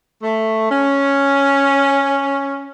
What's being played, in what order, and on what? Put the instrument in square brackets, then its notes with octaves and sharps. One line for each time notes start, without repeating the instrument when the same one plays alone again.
[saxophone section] A3
C#4